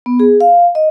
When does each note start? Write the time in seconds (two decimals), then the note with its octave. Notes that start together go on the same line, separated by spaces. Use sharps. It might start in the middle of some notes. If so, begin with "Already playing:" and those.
0.06 B3
0.20 G#4
0.41 F5
0.75 D#5